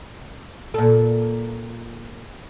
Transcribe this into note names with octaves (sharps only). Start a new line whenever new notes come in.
A#2 A4